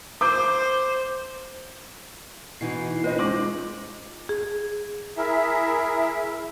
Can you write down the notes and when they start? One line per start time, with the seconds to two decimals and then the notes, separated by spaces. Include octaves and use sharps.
0.21 C5 D6 G6
2.61 B2 E3 D#4 E4 C7
3.04 C4 D4 D#4 F4 B4 C5 D#5
3.19 G#3 C#4 D6 A#6 F#7
4.29 G#4
5.17 E4 G#4 A#4 E5